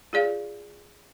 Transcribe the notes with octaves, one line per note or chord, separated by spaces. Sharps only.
F4 G#4 D5 F5